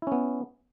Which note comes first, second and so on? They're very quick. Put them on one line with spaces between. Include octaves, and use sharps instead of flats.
E4 C#4 B3